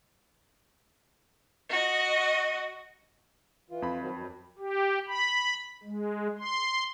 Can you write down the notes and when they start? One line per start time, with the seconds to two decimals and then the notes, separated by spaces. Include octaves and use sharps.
1.69 F#4 D#5
3.70 E3 F4
3.82 F2 B5
4.00 D#3 F3 F#3
4.14 F#2
4.59 G4
5.08 B5
5.83 G#3
6.39 C6